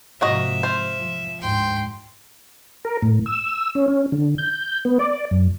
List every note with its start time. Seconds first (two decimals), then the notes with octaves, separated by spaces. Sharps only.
0.21 G#2 C3 F3 A#3 F#4 D#5 E5
0.63 F4 C5
0.96 F3
1.40 D2 G#2 G5 C6
2.85 A#4
3.02 A2
3.26 E6
3.75 C#4
3.88 C#4
4.12 D3
4.38 G6
4.85 B3
4.99 D5
5.31 F#2